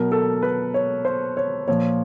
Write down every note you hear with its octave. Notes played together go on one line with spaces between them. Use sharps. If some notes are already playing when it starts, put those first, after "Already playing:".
Already playing: B2 F#3 A#4
A4
B4
C#5
C5
C#5
A#2 F3 C#5